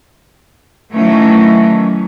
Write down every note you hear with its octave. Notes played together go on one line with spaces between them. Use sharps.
D#3 E3 F#3 A3 C#4